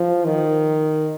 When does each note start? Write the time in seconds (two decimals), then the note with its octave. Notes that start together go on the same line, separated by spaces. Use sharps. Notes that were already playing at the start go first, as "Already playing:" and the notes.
Already playing: F3
0.26 D#3